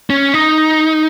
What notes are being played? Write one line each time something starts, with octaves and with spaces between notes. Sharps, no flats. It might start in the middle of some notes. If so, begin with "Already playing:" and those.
C#4
D#4